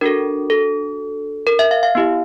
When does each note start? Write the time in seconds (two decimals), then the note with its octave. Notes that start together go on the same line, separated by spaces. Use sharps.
0.01 D4 F#4 A4 A#4
0.50 A4
1.47 A#4
1.59 E5
1.71 F5
1.83 F5
1.95 B3 E4 G4